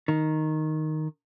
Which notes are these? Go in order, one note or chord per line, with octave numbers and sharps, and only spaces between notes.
D#3